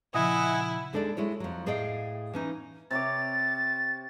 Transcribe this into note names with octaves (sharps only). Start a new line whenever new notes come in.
A#2 C#3 F3 E4 D#5 E5 F#5 G#5
D#2 G#3 D4 A4 B4 D5
G#3 E4 F#4 C#5
F2 F#3
A2 G#4 D5 D#5 F5 G5
E3 C#4 D#4
C3 C#5 D6 A6